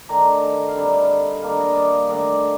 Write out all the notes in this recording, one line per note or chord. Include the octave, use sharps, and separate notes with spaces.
D#3 A3 D4 A#5
F5
D3 G3 C4 D#4 G5
D#3 A#3 D4 F5
D#5
D5
D#3 A3 D4